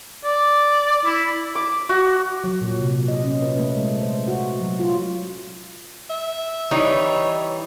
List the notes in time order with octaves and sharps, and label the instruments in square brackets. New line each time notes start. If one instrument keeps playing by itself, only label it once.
[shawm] D5
E4
[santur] D6
F#4
[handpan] F#3
A#2
C3
D#5
C#4
B4
A3
G#3
C5
F#4
F#3
F4
[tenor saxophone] E5
[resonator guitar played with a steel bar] E3 G3 D#4 [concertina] C#5